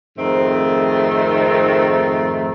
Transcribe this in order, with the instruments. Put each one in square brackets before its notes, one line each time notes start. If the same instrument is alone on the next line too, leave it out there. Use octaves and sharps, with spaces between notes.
[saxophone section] F2 G#2 D#3 A3 C4